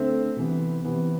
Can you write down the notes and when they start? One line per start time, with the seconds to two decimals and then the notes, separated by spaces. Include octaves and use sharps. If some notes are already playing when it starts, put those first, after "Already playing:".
Already playing: D3 A3 C4 C5 E5
0.36 C3 E3 B3
0.84 C3 E3 B3